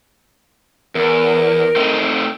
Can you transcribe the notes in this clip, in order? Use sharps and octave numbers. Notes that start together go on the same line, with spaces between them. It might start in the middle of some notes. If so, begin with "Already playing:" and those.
E2 A#4
A3 C4 D#4